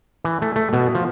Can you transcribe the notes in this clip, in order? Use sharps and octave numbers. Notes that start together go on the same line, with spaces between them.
E3
A3
A3
B2
F3